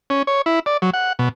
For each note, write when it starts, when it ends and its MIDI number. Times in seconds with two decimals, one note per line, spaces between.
0.10 0.22 61
0.27 0.42 73
0.46 0.60 64
0.66 0.77 74
0.82 0.90 54
0.93 1.13 78
1.19 1.29 47